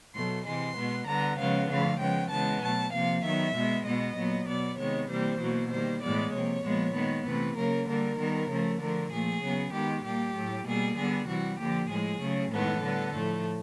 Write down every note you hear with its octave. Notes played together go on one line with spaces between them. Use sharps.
B2 F#3 A3 C6
C3 E3 G#3 C6
B2 G#3 B3
D3 G3 B3 A#5
C#3 F3 G#3 B3 F5
D3 F3 A3 F5
C#3 F3 G#3 B3 G5
C#3 E3 G#3 B3 A5
B2 F#3 A3 A5
C3 F3 A#3 F5
D#3 F#3 B3 E5
B2 G#3 B3
B2 G#3 B3 D#5
A#2 F#3 B3
B2 F#3 B3 D5
C3 D#3 G#3 B3 C#5
C3 E3 G3 A#3 C5
B2 F#3 A#3
D#3 G3 A#3 C5
A2 E3 G#3 B3 D5
C3 F3 A#3 C#5
A#2 F3 G#3 B3
D#3 G#3 B3
C3 E3 A3 B4
C#3 F#3 A#3 A#4
D3 G3 A#3 A#4
D#3 G3 B3
C#3 F3 A3
D3 F3 A3 A#4
A#2 F3 A3 G#4
C#3 F#3 B3
D#3 G#3 B3 G4
A#2 G3 A#3 G4
A2 F#3 A3
B2 G3 A#3 G#4
D3 G3 B3 G#4
C3 E3 G3 F#4
D3 F3 A#3 G4
A2 F3 G#3 G#4
C#3 F#3 A3
A2 E3 G#3 B3 A4
D3 G3 B3
A2 F3 A3